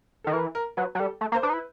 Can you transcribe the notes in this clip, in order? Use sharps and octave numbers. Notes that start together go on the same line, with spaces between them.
D#3 A4
E3 A#4
A#4
F#3 B4
F#3
G3 A4
A3
A#3
C5
D4 B4
D#4
E4